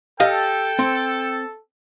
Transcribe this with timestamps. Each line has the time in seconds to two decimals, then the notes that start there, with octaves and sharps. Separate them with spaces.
0.20 G4 A4 D#5 F5 G5
0.79 C4